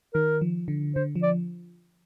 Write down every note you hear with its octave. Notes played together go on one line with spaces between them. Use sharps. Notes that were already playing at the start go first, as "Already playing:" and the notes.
D#3 A#4
F3
D3
D3 C5
F3
D5